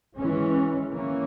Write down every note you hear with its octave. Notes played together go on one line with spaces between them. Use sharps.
E3 G#3 C#4
E3 A#3 C#4